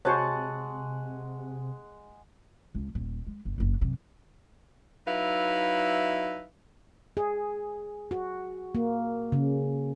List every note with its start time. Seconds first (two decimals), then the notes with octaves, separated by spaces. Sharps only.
0.05 C3 G#3 F#4 C5 C#5 F#5 A5 C#6
2.75 C#2
2.95 D#1
3.27 G#3
3.45 F#1
3.58 F#1 D4
3.81 F#2 C3
5.07 F#3 D#4 E4 B4 E5 F5
7.17 G#4
8.11 F#4
8.75 A#3
9.32 C#3